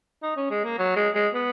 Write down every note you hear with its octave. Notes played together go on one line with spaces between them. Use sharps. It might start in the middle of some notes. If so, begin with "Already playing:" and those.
D#4
C#4
G#3
A#3
F#3
G#3
G#3
B3